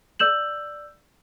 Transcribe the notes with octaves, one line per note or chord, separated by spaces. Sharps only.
D5 E6 G6 E7 F#7